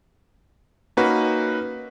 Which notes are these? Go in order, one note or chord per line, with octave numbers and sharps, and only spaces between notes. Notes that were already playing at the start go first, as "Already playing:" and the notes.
A#3 C#4 D#4 F#4 B4